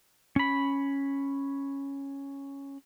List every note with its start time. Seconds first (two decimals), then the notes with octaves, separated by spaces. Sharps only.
0.36 C#4 B5